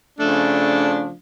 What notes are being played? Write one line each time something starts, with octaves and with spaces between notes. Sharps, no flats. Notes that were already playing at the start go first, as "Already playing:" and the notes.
C#3 F3 A3 D4